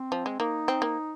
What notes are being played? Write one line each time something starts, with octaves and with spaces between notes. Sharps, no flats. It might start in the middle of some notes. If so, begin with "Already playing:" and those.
Already playing: C4
F3
G#3
A#3 D#4
C4
A#3